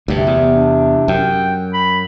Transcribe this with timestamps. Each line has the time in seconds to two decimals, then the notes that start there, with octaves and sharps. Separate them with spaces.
0.08 D2 G2 C3
0.27 E2 B3
0.55 D4
1.08 F#2 G5
1.74 B5